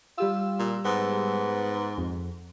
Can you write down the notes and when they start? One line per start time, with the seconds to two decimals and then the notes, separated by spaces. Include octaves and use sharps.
0.18 G3 F4 G4 E6
0.59 A#2
0.85 G#2 B3
1.98 F2